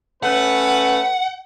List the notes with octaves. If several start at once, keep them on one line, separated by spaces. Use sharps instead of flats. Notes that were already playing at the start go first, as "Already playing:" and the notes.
A3 C#4 B4 F#5